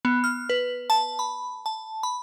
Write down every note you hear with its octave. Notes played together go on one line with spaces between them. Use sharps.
B3
F6
B4
A5
B5
A5
B5